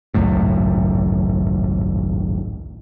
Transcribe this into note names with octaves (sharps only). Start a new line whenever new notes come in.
G#1 C#2 F#2 A2